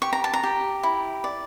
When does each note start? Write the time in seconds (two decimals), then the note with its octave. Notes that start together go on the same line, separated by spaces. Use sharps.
0.02 G4 C#6
0.13 A#5
0.24 A5
0.33 A#5
0.43 G4
0.83 E4
1.24 D5